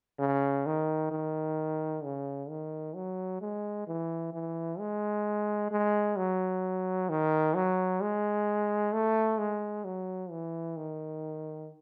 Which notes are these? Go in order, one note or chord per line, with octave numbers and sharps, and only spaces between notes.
C#3
D#3
D#3
C#3
D#3
F#3
G#3
E3
E3
G#3
G#3
F#3
D#3
F#3
G#3
A3
G#3
F#3
E3
D#3